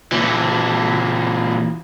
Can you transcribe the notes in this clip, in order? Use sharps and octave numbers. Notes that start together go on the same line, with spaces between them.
A#2 E3